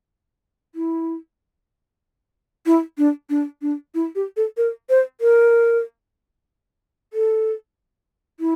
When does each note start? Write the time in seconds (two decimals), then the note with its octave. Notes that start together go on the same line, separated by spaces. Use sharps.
0.75 E4
2.66 E4
2.98 D4
3.30 D4
3.62 D4
3.95 E4
4.15 G4
4.37 A4
4.57 A#4
4.90 C5
5.21 A#4
7.13 A4
8.40 E4